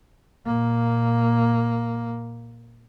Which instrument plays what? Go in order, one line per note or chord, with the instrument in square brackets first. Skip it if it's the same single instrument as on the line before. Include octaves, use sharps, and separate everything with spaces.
[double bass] A#2 A#3